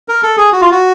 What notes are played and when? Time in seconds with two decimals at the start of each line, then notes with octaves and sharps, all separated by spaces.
0.08 A#4
0.23 A4
0.37 G#4
0.52 F#4
0.61 F4
0.71 F#4